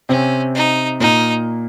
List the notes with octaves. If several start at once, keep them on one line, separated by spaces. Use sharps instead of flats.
C3 C4 C#4
D#4
A#2 A#3 D#4